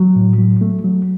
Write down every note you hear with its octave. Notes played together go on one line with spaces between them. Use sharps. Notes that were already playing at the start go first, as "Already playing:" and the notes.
Already playing: F#3
A2
F#3
A3
F#3